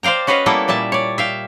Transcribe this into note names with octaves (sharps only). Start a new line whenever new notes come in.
C5 D5 F5 G5 A#5
C#4 F#4 B4 D#5 F5
G3 A#3 B3 E4 A4
A#2 G3 E5 A5
C#5 D5
E5 F5 G5